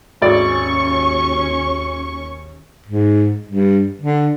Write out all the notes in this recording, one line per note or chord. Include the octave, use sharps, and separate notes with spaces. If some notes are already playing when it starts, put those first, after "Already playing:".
G#1 D#2 C#4 D5 C#6
G#2
G2
D3